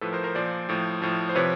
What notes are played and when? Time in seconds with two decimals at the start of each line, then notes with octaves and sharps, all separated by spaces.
0.01 A2 F3 A4 B4
0.13 A#4 C5
0.24 A#4 C5
0.35 A#2 F3 C5 D5
0.69 A2 F3
1.02 A2 F3
1.29 C5
1.35 C3 F3 B4 C#5